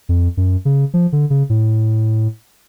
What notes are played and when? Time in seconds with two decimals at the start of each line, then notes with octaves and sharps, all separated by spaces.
0.09 F2
0.37 F#2
0.65 C#3
0.94 F3
1.12 D3
1.30 C#3
1.50 A2